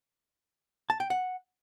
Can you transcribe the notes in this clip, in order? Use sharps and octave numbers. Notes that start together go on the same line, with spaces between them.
A5
G5
F#5